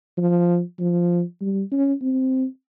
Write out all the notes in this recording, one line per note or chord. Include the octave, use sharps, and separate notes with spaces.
F3
F3
G3
C#4
C4